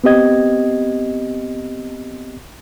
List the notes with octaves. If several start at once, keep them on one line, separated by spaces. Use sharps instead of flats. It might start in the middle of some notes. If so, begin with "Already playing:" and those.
B3 C4 G4 D#5 G#6